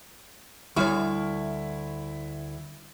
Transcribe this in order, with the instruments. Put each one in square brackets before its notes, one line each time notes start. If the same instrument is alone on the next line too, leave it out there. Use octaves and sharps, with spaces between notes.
[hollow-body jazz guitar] D2 D3 C#5 [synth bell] G3 E5 C#6 [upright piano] E4